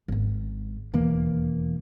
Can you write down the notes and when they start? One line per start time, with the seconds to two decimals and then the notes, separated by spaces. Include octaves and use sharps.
0.08 G#1 G#2
0.94 E1 D#2 E3 A#3